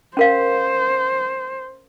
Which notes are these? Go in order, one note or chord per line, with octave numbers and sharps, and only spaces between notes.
C#4 A#4 C5 F5